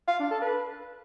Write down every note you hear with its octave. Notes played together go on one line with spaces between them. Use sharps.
F5
D4
A4
B4